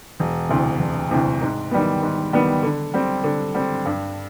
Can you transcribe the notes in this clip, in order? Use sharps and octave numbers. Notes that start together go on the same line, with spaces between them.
E1
D2 C3 E3
E1
D2 C3 E3
G#2
D#3 G3 B3
G#2
D#3 G3 B3
D3
G3 C4
D3
G3 C4
G2